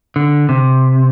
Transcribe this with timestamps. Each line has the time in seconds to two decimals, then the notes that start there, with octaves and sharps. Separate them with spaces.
0.16 D3
0.49 C3